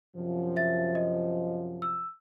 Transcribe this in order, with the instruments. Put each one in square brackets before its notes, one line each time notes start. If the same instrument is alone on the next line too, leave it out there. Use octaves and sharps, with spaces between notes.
[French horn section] F#2 C3 F3
[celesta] E5 A6
D#5
E6